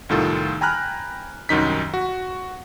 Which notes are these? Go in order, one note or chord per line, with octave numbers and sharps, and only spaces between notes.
C2 A2 D#3 F4 A4
G5 G#5 A#5 B5 F6 F#6
C2 F#2 D#3 D#4 B6
F#4